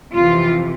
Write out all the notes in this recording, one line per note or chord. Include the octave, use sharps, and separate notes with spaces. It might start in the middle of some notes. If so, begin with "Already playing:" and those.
F2 C3 E3 F4